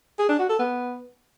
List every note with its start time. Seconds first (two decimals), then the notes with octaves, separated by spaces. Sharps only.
0.19 G#4
0.29 D4
0.39 F#4
0.49 A4
0.59 B3